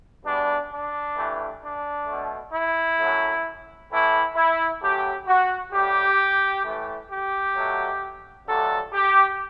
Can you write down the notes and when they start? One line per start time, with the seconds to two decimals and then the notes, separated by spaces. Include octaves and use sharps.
0.24 E2 B2 G3 D4
0.70 D4
1.16 G2 E3 A3
1.61 D4
2.07 B2 A3
2.52 E4
2.98 F#2 F#3 A3
3.90 A2 E3 A3 E4
4.36 E4
4.81 F#2 F#3 A3 G4
5.27 F#4
5.72 A2 G3 G4
6.64 A2 E3 A3
7.09 G4
7.55 B2 F#3 A3
8.47 G2 D3 F#3 A3 A4
8.93 G4